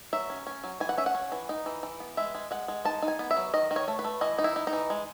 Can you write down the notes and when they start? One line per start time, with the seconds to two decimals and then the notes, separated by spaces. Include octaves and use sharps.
0.13 F#3 E5
0.30 C#4
0.47 C#4
0.64 F#3
0.80 E3 G#5
0.89 F#5
0.97 C#4 E5
1.06 F#5
1.15 C#4
1.32 E3
1.49 D#4
1.66 E3
1.83 E3
2.00 B3
2.17 G#3 E5
2.35 G#3
2.51 G#3 F#5
2.68 G#3
2.85 D#4 A5
3.02 D#4
3.08 G#5
3.19 B3
3.31 E5
3.37 F#3
3.54 D#3 D#5
3.71 D#3
3.76 C#5
3.88 A3
3.99 B4
4.04 A3
4.21 E3 D#5
4.39 D#4
4.44 E4
4.56 D#4
4.67 D#4
4.73 E3
4.90 G#3